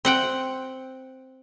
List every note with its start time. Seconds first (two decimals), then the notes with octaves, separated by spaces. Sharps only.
0.05 C4 F#5 G5